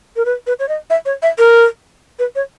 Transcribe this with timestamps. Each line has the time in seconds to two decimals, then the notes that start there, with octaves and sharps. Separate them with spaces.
0.16 A#4
0.25 B4
0.47 B4
0.59 C#5
0.68 D#5
0.90 E5
1.06 C#5
1.22 E5
1.38 A#4
2.19 B4
2.35 C#5